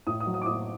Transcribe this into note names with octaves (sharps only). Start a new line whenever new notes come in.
A2 D#6
D#6
F#3
D#6
D6
A2 D#6